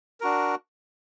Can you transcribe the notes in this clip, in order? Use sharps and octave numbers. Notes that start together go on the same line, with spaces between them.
D4 F#4 A#4